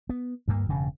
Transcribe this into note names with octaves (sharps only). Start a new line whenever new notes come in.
B3
D2 G2 A#3
E1 G2 C#3